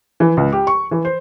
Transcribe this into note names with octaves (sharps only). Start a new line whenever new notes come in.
E3
C#2
G4
C#6
E3
C5